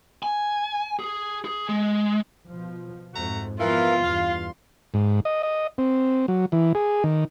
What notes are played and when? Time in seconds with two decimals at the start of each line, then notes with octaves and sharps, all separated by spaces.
0.23 G#5
0.99 G#4
1.45 G#4
1.69 G#3
2.47 B2 F3
3.13 F2 G#2 A3 F#4 A#5
3.60 E3 F3 B3 F4 A#4 F5
4.04 E2 G2 F5 C6
4.94 G#2
5.25 D#5
5.43 D#5
5.78 C4
6.28 F#3
6.52 E3
6.75 G#4
7.04 D#3